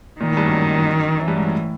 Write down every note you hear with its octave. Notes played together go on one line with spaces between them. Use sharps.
A#2 D#3
A2
G2
F#2
F#2 E3
G2
G#2
A2